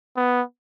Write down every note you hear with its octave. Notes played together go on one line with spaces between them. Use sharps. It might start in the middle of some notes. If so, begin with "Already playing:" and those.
B3